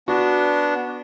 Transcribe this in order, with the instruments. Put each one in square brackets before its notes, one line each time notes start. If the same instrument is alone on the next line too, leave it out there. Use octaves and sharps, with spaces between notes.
[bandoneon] B3 D4 [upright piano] F#4